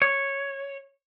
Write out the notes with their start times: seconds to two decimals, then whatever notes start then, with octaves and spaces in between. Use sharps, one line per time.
0.02 C#5